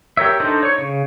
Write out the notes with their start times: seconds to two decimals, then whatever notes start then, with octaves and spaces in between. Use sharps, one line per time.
0.17 G4 A#4 C#5 E5
0.40 D4 D#4 A4 C5 A#5
0.63 C#5 C#6
0.78 C#3